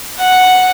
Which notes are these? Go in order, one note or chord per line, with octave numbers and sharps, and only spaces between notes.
F#5